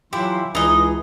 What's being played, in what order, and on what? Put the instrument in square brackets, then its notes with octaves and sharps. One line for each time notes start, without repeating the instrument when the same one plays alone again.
[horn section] E3 F4 C6 [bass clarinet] F#3 [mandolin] E4 [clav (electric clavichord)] G4
[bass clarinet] C#2 [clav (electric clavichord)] E3 [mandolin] D#4 D#5 [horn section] G#4